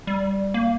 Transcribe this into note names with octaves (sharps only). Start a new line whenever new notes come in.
G3
A#3